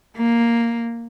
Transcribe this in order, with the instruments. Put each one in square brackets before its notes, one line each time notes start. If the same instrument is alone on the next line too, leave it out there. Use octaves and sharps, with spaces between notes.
[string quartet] A#3